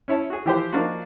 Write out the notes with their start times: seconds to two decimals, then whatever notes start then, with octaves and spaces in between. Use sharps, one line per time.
0.08 C#4 E4 C#5 A5
0.30 F#4 G#4
0.46 E3 F3 G4 B4 C5
0.72 F3 A#3 D4 D#4 F4 F#4